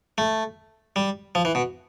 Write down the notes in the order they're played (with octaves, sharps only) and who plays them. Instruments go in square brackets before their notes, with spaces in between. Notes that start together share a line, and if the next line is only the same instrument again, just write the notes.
[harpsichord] A3
G3
F3
E3
B2